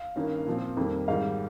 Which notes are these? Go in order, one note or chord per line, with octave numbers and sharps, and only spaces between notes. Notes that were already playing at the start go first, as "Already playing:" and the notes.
Already playing: F5
G2 D#3 A#3 C#4
A#2 F3 C4
F2 D#3 G3 A#3
G#2 D#3 G3 F5